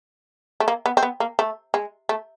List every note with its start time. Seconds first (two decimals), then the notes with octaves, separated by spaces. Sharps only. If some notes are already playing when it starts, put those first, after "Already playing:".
0.60 A3
0.68 A#3
0.86 B3
0.97 C4
1.03 B3
1.20 A#3
1.39 A3
1.74 G#3
2.09 A3